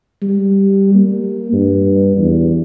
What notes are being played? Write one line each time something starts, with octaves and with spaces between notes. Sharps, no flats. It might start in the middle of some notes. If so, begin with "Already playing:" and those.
G3
A#3
G2
E2